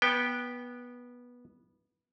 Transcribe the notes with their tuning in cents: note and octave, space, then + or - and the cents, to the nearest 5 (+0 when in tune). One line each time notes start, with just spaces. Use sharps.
B3 -15 G5 +5